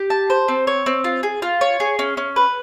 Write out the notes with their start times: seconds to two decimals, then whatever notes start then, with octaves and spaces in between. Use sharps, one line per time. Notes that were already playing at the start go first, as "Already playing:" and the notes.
Already playing: G4
0.10 A5
0.30 C5
0.48 C4
0.67 C#5
0.86 C4
1.04 F4
1.23 G#4
1.42 F4
1.61 C#5
1.80 G#4
1.99 C#4
2.17 C#4
2.36 B4